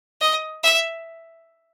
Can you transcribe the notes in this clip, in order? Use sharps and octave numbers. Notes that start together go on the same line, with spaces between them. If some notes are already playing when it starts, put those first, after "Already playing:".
D#5
E5